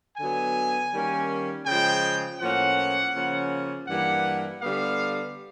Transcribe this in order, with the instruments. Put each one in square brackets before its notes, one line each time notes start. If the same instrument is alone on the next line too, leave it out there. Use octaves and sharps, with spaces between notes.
[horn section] D3 F#3 B3 G#5
D#3 G3 A#3 C#4
C#3 F3 G#3 G5
A2 F3 A#3 C#4 F#5
C#3 F3 A#3 C#4
G2 E3 G3 A#3 F#5
D3 G3 B3 F5